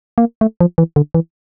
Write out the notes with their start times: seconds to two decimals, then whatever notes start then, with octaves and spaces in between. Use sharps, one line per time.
0.18 A#3
0.41 A3
0.61 F3
0.78 E3
0.96 D3
1.14 E3